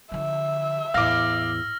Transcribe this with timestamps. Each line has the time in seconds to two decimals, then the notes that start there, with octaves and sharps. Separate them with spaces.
0.12 D3 F3 E5
0.94 E2 A2 F5 D6 E6 F6 A#6